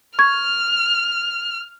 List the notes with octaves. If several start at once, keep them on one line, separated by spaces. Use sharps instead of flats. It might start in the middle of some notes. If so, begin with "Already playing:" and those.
C#6 F6 G#6